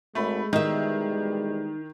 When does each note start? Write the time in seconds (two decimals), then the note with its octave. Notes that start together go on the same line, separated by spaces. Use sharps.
0.15 G#1 G#3 A3 B5
0.53 B2 D#3 E3 G3 D#4 E5